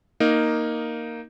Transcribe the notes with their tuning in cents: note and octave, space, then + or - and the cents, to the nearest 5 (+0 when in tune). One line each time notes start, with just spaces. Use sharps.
A#3 +0 D#4 +0